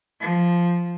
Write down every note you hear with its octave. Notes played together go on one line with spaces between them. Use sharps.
F3